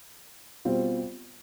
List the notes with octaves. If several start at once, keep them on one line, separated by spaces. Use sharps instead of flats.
B2 G3 C4 F4